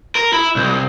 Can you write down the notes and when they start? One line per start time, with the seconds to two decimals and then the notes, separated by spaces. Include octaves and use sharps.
0.15 A#4
0.33 E4
0.56 C2